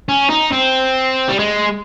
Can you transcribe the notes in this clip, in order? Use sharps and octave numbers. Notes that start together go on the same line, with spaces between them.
C#4
D#4
C4
G3
G#3